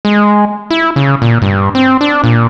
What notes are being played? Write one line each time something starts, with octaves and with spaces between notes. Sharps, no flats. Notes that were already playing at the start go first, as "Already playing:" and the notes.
G#3
E4
C#3
A#2
G2
C4
D4
A#2